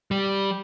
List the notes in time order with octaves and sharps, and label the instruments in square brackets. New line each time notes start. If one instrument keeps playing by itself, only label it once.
[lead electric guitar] G3